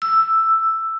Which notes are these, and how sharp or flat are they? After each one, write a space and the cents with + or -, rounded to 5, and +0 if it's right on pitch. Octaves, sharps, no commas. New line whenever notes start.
E6 +5